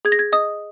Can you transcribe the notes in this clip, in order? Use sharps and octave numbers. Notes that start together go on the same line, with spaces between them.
G#4 G#6
A#6
G#6
D#5 D#6